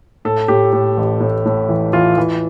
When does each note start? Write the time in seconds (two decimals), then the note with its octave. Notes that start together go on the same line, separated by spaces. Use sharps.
0.25 A2 A4
0.48 A2 G4
0.72 A2
0.97 A1
1.20 A2
1.45 A2
1.69 E3
1.93 E3 F4
2.18 E3